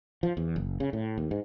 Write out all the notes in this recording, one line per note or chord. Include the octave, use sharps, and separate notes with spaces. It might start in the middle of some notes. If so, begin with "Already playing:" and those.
F3
E2
F#1
C#3
A2
D#2
G#2